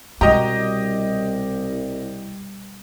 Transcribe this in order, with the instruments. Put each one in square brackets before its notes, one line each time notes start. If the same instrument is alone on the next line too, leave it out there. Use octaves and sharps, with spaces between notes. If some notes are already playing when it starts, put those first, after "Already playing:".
[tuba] C2 [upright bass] B2 G3 [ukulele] F#4 A#5 [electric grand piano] G4 D#5